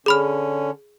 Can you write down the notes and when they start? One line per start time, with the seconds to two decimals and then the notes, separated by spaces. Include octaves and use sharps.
0.06 D3 C#4 G#4 B5 F6